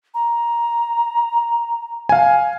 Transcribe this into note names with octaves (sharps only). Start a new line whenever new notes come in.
A#5
F5 G#5